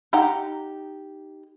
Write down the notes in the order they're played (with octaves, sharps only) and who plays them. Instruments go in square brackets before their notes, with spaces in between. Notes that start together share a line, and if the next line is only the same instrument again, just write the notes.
[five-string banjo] D#4 G4 F#5 A#5